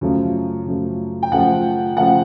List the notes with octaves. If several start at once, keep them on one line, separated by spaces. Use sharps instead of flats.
F#2 C#3 F3 A3
F#2 C#3 F3 A3
G5
F#2 C#3 F3 A3 F#5
C#3 F3 A3 F#5